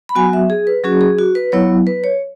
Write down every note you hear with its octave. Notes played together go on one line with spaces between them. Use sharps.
B5
F#3 B3 F#4 G#5
E5
G#4
B4
F#3 C#4 F#4 G#4
G#4
F#4
B4
F#3 B3 E4 C#5
B4
C#5